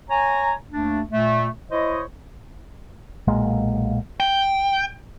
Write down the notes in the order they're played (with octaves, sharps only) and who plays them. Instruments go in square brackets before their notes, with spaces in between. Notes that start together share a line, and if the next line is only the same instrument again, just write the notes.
[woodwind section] C#5 G#5 A#5
D#2 A3 D4
A#2 A3
E4 C5 C#5 D#5
[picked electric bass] B1 A#2 G#3 A#3
[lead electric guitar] G5